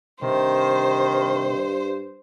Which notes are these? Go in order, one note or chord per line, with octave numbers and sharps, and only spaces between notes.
G2 C3 D#3 C5